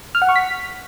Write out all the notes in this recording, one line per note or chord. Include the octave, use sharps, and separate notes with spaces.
F6
F#5
C#6
B6